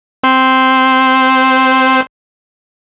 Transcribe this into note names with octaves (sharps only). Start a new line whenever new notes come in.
C4 C5